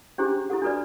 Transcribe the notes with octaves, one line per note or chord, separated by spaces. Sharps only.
C#4 D4 E4 G4 G#4 C5
E4 G4 A4 F#5
D4 F#4 A4 B4 D5